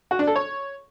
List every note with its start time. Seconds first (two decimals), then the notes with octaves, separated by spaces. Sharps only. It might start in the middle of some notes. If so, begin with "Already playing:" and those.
0.11 F#4
0.19 D4
0.27 A4
0.36 C#5